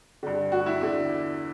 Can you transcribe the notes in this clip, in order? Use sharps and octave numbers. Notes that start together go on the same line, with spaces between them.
G2 D3
F#4
E4
E2 D3